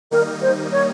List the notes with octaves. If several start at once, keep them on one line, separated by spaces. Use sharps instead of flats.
D#3 G3 A#3 D#4 A#4
C5
C#5